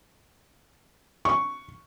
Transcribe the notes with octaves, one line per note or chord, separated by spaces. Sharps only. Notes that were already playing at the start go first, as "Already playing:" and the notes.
C#6